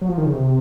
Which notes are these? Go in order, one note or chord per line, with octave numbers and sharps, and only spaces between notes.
F#3
F3
D#3
C#3
C3